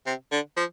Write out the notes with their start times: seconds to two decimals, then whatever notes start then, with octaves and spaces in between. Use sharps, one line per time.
0.06 C3
0.32 D3
0.57 F3